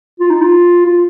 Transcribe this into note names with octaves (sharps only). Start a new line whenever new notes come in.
F4
D#4
F4
F4